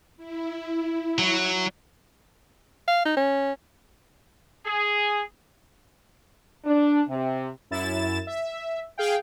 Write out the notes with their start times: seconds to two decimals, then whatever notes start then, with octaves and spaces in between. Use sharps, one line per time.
0.17 E4
1.19 F#3
2.88 F5
3.05 D#4
3.17 C#4
4.66 G#4
6.65 D4
7.09 C3
7.71 F#2 E4 A6 E7
8.27 E5
8.98 G#4 F5 G5